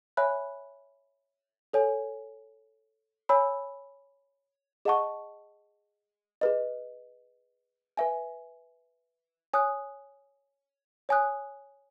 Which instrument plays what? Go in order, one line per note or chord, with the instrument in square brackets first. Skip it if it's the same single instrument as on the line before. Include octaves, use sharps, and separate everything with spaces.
[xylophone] C#5 E5 G#5 B5 F#6
A4 C#5 G#5
C#5 G#5 B5 E6
G#4 D#5 F#5 A5 C#6
G#4 B4 D#5
B4 E5 G#5
C#5 G#5 D#6 F#6
C#5 G#5 D#6 F#6